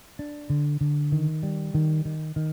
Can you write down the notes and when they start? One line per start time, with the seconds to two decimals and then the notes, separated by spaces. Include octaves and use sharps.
0.19 D4
0.50 D3
0.81 D3
1.12 D#3
1.43 G3
1.74 D#3
2.05 D#3
2.36 D#3